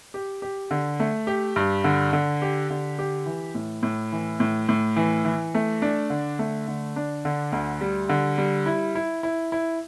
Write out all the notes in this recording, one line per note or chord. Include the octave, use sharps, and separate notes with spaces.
G4
G4
D3
A3
G4
G2
D3
D3
G4
D3
G4
E3
A2
A2
E3
A2
A2
E3
E3
A3
D4
D3
A3
D3
D4
D3
D2
G3
D3
G3
E4
E4
E4
E4